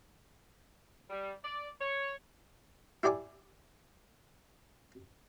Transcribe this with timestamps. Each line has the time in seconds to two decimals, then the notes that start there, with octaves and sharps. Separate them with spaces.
1.10 G3
1.44 D5
1.81 C#5
3.03 E4 G4 D5 G#5 D6